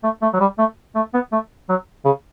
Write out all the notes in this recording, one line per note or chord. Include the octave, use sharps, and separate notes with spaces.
A3
A3
F#3
G3
A3
A3
B3
A3
F#3
C#3